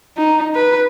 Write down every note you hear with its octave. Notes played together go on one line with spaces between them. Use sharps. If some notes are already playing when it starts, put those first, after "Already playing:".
D#4
B4